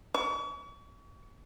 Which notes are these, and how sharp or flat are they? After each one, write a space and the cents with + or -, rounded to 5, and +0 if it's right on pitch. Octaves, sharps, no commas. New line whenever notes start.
C#6 +40